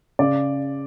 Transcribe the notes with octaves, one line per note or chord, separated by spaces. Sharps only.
C#3 D5